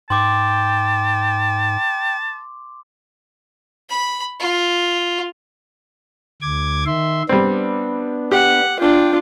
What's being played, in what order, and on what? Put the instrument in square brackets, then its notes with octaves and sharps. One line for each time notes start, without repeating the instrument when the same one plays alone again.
[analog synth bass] G#2 [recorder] G5 [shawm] A5 [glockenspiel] C6 D6
[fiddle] B5
F4
[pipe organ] D2 D6 G#6
D#3 E5 C6
[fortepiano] G3 C4 [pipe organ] B3 D4
[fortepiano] G4 [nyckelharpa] F#5
[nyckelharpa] D4 F4 [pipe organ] G5